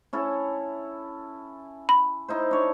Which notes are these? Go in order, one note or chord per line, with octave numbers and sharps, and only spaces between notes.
C#4 E4 A4
B5
D#4 E4 C5
D4 C#5